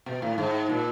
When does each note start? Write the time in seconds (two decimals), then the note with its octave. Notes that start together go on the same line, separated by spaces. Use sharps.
0.06 B2
0.22 A2
0.38 G#2
0.70 A#2